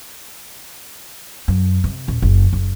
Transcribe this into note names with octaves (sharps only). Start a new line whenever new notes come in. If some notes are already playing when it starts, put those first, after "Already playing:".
F#2
C3
D#1
F#1
F#1